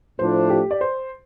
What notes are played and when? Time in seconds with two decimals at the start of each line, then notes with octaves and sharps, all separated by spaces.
0.19 A2 F3 A3 D4 C5
0.50 G4
0.71 D5
0.81 C5